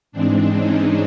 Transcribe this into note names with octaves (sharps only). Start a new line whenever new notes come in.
G#2 E3 G#3 C4 D4
C#4 D#4